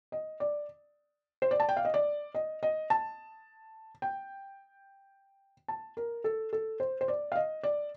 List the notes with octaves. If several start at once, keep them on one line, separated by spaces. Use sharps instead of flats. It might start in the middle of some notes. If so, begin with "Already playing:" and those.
D#5
D5
C5
D5
A5
G5
F5
D#5
D5
D#5
D#5
A5
G5
A5
A#4
A4
A4
C5
C5
D5
F5
D#5
D5